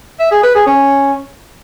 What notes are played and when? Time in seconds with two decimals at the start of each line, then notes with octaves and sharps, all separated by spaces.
0.19 E5
0.31 G#4
0.43 B4
0.55 G#4
0.66 C#4